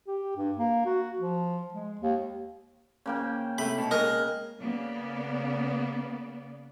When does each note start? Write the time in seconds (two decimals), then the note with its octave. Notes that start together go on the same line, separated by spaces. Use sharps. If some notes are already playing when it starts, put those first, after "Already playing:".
0.07 G4
0.36 G2
0.58 A#3
0.86 F#4
1.19 F3
1.74 G#3
2.01 D#2
3.06 C#3 A#3 G5
3.58 C3 A3 B5
3.78 B2
3.91 G#3 A#4 D#5
4.60 C#3 A#3 B3 D5